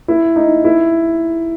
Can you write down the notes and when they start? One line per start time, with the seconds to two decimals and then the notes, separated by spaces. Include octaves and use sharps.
0.08 E4
0.36 D#4
0.64 E4